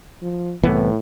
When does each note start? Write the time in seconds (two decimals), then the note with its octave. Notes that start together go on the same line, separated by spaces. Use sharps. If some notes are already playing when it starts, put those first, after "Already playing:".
0.22 F3
0.63 C2 A2 E3 B3